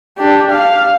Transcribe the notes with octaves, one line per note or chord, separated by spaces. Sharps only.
D4 G4
F5